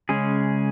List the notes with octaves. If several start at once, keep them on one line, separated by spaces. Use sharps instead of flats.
C#3 G#3 C#4 G#4